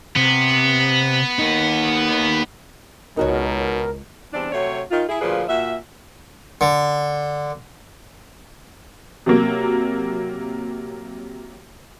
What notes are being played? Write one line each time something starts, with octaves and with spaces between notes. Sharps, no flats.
C3 B3
A#3 D#4
C#2 B2 D#4 F#4 A#4 C#5
E2 G3 C4 D4
C3 F#3 A3 C#5
D#3 F4
E4 G#4
D2 A#2 F3 G#4 B4
A#2 F#4 E5
D3
C3 F#3 A#3